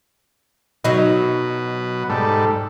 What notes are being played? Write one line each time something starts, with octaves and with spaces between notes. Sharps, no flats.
B2 F#3 D#4 B4
G#2 G3 A4